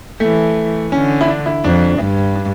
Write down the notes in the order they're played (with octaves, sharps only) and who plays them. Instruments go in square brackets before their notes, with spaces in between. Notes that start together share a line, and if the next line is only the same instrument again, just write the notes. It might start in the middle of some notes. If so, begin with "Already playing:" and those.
[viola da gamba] E3 [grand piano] A3
[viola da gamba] D3 [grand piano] C#4
[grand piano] E4
D4
E4
[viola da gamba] F2 [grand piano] D4
[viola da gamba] G2
[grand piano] D4